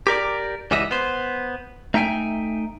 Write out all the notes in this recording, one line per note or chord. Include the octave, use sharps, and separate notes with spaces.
G4 A#4 D5
C#2 E3 G3 F#4 D#5 E5
B3 C5
A3 D#4 E5 G5 G#5